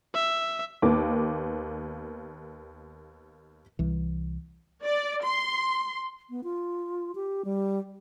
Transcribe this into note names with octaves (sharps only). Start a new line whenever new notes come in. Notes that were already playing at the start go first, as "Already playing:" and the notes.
E5
D#2 A#3 B3 D6
C2 E3
D5
C6
B3
F4
G4
G3